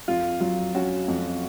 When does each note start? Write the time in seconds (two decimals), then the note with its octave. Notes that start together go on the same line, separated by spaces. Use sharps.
0.08 F2 F4
0.40 F#3 F4
0.75 C#4 F#4
1.08 F2